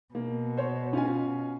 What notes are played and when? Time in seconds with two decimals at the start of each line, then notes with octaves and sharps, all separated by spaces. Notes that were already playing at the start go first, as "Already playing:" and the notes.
0.15 B2 A#3
0.57 C5 C#5
0.93 C#4 F4 G#5